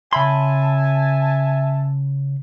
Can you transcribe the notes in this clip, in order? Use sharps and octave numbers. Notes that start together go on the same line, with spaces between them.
C#3 E5 G#5 A5 B5 C6